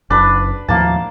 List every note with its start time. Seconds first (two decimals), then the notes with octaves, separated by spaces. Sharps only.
0.10 F#1 D4 B4
0.68 D#2 A2 F3 A#3 A5